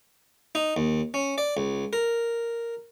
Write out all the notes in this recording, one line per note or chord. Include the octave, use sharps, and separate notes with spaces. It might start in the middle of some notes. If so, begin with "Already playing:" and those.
D#4
D#2
C#4
D5
C#2
A#4